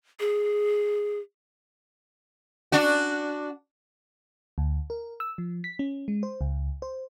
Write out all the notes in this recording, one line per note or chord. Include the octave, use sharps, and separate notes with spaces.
G#4
D4 F#4
D2
A#4
E6
F3
B6
C#4
G#3
C5
C#2
C5